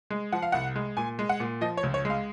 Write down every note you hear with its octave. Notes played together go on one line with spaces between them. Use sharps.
G#3
F3 F#5
F5
C2 F#5
G#3
A#2 G#5
G#3
F#5
A#2
F3 D#5
C#5
C#2
C#5
G#3
F5